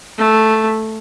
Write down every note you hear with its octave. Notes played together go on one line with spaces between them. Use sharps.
A3